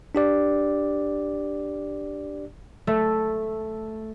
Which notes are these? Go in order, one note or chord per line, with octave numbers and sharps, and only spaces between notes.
D4 G4 D5
A3